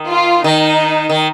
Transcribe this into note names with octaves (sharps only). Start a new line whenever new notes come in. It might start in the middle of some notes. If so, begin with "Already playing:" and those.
Already playing: D#3
F4
D#3 D#4
D#3